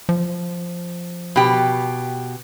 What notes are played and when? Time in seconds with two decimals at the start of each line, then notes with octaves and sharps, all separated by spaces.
0.09 F3
1.36 B2 G4